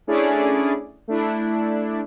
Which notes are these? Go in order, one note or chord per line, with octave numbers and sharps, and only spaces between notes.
A3 C#4 D4 E4 G#4 D5
A3 D4 E4